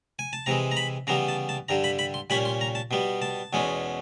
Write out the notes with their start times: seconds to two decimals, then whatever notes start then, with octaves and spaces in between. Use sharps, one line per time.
0.19 G#5
0.33 A5
0.46 C3 E3 G#3 A#5
0.71 A#5
0.77 B5
1.07 C#3 E3 G3 B3 A#5
1.28 A5
1.49 A5
1.69 G2 D3 G3 A#5
1.84 B5
1.99 B5
2.14 C6
2.30 A#2 G3 A#3 C#4 B5
2.45 C6
2.61 A#5
2.75 A5
2.91 B2 G3 B3
3.22 A5
3.53 E2 B2 G#3 C#4